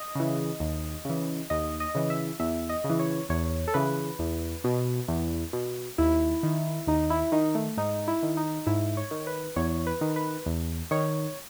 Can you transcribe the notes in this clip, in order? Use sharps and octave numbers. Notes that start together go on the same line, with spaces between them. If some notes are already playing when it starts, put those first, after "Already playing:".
Already playing: D#5
C#3 E3
D#2
C#3 E3
D#2 D#5
D#5
C#3 E3
E5
E2 E5
D#5
C#3
E3
C#5
E2 C#5
A4
C#3 E3 B4
E2
B2
E2
B2
D#2 E4
D#3
D#2 D#4
E4
D#3 D#4
A3
G#2 D#4
E4
D#3
D#4
G#2 E4
C#5
D#3
B4
E2 C#5
B4
D#3
B4
E2
D#3 C#5